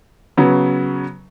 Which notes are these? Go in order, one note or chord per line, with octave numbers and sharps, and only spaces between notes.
C#3 F#3 B3